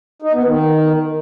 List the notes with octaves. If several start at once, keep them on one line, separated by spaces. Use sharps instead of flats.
D#4
B3
D#3